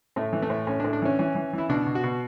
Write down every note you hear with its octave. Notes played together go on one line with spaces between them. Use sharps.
A2 A3
E3
A3
A2
A2 C#4
D4
A2
D4
E3 C#4
E3 C#4
E3
E3 E4
B2 D4
B2
F#4
B2